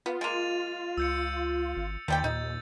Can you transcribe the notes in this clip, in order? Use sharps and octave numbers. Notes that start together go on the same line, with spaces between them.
B3 F4
G#3 A#3 A6 D#7 F7
C#2 E6 G6 C#7
G#1
D#2 D#3 F3 G3 G5 G6 A6
A#2 D#4